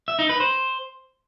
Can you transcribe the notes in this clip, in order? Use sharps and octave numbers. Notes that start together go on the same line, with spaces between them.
E5
D#4
B4
C5